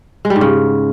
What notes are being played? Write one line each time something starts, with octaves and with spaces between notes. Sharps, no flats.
G#3
G3
G#2
C#3